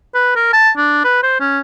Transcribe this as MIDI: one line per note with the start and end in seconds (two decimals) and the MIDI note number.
0.14 0.33 71
0.36 0.50 70
0.53 0.70 81
0.77 1.01 62
1.04 1.21 71
1.23 1.40 72
1.40 1.59 61